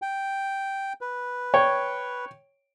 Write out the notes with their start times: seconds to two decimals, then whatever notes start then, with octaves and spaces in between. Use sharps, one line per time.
0.02 G5
1.01 B4
1.54 C#5 G5